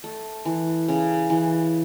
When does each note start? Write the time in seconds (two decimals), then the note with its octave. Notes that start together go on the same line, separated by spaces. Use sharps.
0.04 A3
0.45 E3
0.88 C#3
1.30 E3